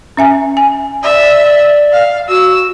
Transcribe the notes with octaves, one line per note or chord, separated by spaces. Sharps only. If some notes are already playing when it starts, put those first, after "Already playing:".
C#4 E5 G#5
G#5
D5 E5
F5
F#4 E6